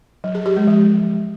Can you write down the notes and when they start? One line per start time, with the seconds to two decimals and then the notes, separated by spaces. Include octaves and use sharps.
0.24 F#3
0.35 G#4
0.46 G4
0.57 G#3
0.67 F3